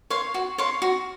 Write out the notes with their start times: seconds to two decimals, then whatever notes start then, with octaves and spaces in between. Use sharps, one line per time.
0.10 C#5 F5 C6
0.34 F#4
0.58 C#5 F5 C6
0.82 F#4